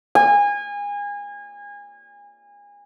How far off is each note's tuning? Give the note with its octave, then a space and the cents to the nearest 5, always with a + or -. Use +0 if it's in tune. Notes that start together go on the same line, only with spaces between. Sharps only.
G#5 -30